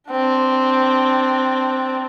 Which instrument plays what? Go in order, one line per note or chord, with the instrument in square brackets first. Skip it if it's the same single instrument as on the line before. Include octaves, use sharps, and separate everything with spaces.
[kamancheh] C4 D4